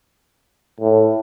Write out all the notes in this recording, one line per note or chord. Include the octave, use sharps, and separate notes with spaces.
A2